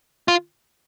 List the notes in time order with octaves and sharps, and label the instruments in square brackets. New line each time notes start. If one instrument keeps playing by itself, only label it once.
[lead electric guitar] F4